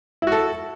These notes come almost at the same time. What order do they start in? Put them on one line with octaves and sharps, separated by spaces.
E4 F#4 A4